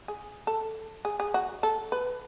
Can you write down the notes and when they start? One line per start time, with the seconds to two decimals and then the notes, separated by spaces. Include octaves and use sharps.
0.08 G#4
0.47 A4
1.05 G#4
1.20 G#4
1.34 F#4
1.63 A4
1.92 B4